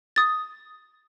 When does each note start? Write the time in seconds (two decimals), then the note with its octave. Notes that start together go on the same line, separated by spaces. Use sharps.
0.16 D#6 A6